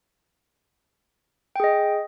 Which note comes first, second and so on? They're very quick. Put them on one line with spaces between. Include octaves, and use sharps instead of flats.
G5 G#4 D#5